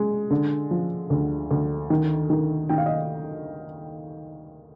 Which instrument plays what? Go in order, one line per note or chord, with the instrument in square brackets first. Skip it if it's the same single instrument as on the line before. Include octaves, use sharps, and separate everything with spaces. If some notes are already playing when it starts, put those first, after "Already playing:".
Already playing: [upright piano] G#3
D3
F3
D2
D2
D#3
D#3
D#3 G5
F5
D#5